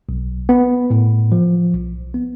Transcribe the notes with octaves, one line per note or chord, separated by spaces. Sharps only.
B1
B3
A2
F3
B1
B3